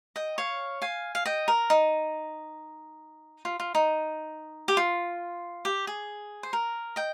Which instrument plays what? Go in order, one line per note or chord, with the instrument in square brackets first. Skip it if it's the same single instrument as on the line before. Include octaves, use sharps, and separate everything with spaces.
[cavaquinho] D#5 G5
C#5 F5
F5 G#5
F5
D#5 G5
A#4
D#4
F4
F4
D#4
G4
F4
G4
G#4
C5
A#4
D#5 G5